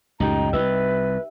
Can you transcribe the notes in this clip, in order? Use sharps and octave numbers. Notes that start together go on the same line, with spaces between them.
C#2 F#2 A2 D#4 G4 A#5
C2 B4 E5